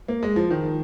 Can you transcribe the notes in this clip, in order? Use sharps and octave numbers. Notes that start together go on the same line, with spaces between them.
A#3
G#3
F3
D#3